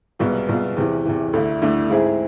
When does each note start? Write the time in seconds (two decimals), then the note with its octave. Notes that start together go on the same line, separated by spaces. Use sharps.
0.19 C2 B2 G#3 B3 F4
0.49 C2 B2 G#3 B3 F4
0.77 E2 C3 E3
1.06 E2 C3 E3
1.33 D2 D3 A3 E4
1.62 D2 D3 A3 E4
1.90 G#2 G#3 C4 E4 G#4